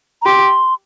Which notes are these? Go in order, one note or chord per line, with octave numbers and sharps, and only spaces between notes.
A#5
G4 C6